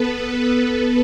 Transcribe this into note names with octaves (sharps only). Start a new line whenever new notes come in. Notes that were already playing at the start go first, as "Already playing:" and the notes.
Already playing: B3 A4 B4
B3